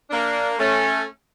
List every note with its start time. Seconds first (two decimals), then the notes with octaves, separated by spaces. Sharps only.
0.10 A#3 D4
0.59 A3 C#4